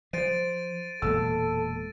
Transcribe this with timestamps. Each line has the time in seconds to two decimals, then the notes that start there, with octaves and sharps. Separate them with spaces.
0.13 F3 C5 A6 D7 D#7
1.02 E1 A#2 G#3 A4 E6